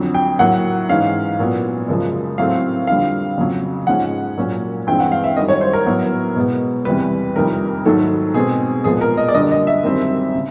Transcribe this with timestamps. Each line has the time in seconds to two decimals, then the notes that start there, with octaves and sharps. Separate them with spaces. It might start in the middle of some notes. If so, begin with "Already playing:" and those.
Already playing: F2 D3 F#3
0.15 G5
0.39 A2 F#3 A#3 F#5
0.89 G#2 E3 G#3 C#4 F5
1.39 A#2 F#3 B3
1.88 F#2 C#3 F3 G#3
2.38 A2 F#3 A3 C4 F5
2.87 F2 D3 G3 C4 F5
3.38 F2 C#3 F#3
3.87 G#2 F3 G#3 C#4 F#5
4.37 A#2 F#3 A#3 C#4
4.87 G2 E3 G#3 C4 G5
5.00 F#5
5.12 F5
5.24 E5
5.37 F#2 D#3 G3 D#5
5.48 C#5
5.61 C5
5.73 A#4
5.86 A2 F#3 B3
6.36 B2 G#3 B3
6.85 E2 C3 E3 G3 B4
7.36 F2 C3 D#3 G3 A#4
7.86 G#2 D#3 F#3 A3 A4
8.34 B2 G#3 C4 G#4
8.84 A#2 F3 G#3 B3 G#4
9.01 A#4
9.17 D#5
9.29 D5
9.34 F#2 D3 G3 A#3 D#5
9.51 D#5
9.67 E5
9.84 F#2 D#3 G3 C4
10.35 C#3